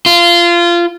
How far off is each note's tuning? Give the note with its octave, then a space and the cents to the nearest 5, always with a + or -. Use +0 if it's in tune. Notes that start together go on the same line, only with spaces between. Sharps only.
F4 -20